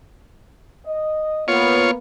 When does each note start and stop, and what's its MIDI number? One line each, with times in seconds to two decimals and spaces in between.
0.86 1.42 75
1.48 1.95 58
1.48 1.95 59
1.48 1.91 65
1.48 1.91 73